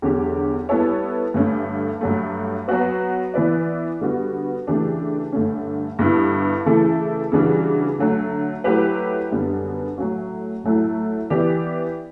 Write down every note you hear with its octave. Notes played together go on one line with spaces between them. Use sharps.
E2 D3 F#3 C#4 G4
G3 B3 E4 A4 C#5
G2 D3 A3 C#4
G2 F#3 A3
F#3 B3 F#4 B4
E3 B3 E4 B4 D5
D3 G3 B3 F#4
C#3 E3 A3 D4 G4
G2 D3 A3 C#4
G2 D3 G3 B3 E4
C#3 E3 A3 E4 A4
C#3 E3 G3 D4 F#4
D3 F#3 A3
F#3 A3 E4 G4 B4
F#2 D3 G3 B3 D4
A2 F#3 A3 C#4 F#4
A2 F#3 A3 E4 A4
E3 B3 E4 G4 D5